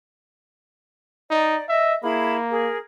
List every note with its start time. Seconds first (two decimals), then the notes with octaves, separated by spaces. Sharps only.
1.31 D#4 D5
1.69 D#5 E5
2.03 A#3 E4 G#4 B5
2.50 G#4 A#4